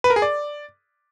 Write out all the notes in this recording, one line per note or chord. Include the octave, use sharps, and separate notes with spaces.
B4
A#4
G#4
D5